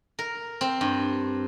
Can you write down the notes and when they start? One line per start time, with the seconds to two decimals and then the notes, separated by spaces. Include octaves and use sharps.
0.19 A#4
0.61 C4
0.81 G2